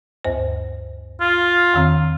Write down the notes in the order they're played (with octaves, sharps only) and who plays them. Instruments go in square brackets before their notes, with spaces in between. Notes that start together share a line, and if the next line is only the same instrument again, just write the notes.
[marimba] D2 G2 C5
[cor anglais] F4
[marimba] E2 D#3 C4